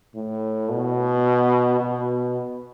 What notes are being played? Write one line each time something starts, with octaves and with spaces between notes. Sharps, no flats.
A2
B2
B2